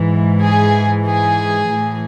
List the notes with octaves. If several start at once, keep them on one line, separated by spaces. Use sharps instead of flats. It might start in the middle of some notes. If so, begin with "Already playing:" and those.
Already playing: G#2 E3
G#4
G#4
A2 E3